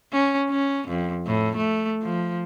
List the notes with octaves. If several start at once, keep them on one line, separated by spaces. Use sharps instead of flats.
C#4
C#4
F2
A2
A3
F3